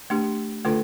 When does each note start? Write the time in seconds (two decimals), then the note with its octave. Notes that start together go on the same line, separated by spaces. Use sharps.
0.10 A3 D4 G4
0.65 D3 A3 D4 F4 A4